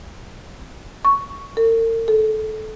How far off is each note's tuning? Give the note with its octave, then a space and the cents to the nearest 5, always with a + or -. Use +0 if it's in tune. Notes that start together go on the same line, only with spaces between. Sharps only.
C#6 +10
A#4 -45
A4 -20